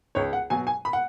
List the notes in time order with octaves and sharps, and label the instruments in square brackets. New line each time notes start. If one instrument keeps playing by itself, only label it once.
[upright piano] C#2 C#5
F#5
B2 F#3 G#5
G#5
B5
F#5